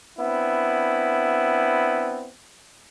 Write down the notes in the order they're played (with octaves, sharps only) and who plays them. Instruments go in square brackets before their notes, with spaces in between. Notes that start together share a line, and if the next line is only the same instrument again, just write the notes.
[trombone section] B3 C4 D4 E4